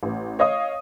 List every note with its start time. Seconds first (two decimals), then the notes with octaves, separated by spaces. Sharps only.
0.03 A1
0.39 C#5 D#5 F5 D#6